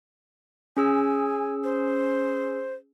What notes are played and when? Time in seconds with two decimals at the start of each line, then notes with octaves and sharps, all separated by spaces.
0.77 C#4 G#4 G#5 E6
1.64 C5